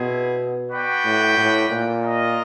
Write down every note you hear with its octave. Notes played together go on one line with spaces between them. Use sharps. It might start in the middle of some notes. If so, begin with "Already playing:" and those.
Already playing: B2 C4 E4 G#4
F#4 B4 D5 G5
A2
A2
A#2
F4 A#4 D#5